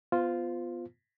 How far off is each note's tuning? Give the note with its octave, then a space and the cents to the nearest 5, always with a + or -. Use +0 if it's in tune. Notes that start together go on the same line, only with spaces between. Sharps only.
B3 +0 F4 +0 C5 -30